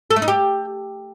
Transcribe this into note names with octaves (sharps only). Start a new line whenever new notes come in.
A4
A3
D#4
G4